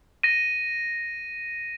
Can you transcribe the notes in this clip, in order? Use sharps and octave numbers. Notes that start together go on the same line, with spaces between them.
A#6 D#7